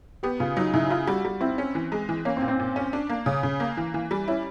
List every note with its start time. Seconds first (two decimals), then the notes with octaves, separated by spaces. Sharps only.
0.23 B3 G4
0.40 C#3 F4
0.57 F#3 D#4
0.74 C#3 E4
0.90 E4 F4
1.07 G3 F#4
1.25 G3
1.41 C4 E4
1.58 C#4
1.75 E3
1.92 G#3
2.09 E3
2.25 A#3 C#4
2.37 C4
2.42 A#2
2.48 C4
2.60 A#2
2.76 C#4
2.93 D4
3.10 A#3
3.26 C#3 C#4
3.43 C#3
3.60 A#3
3.77 E3
3.94 E3
4.11 G3
4.28 C#4 E4